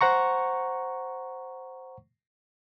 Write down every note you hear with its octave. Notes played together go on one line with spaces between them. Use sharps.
C5 F#5 A#5 C#6